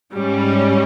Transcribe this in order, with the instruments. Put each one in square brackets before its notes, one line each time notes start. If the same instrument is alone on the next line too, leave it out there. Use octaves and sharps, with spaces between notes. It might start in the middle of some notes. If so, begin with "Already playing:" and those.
[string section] G#2 G3 C#4